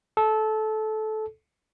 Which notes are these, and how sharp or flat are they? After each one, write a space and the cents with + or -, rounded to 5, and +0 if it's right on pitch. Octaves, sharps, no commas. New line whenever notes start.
A4 -20